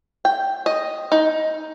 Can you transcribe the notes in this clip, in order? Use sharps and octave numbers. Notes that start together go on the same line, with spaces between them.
G5
D#5
D#4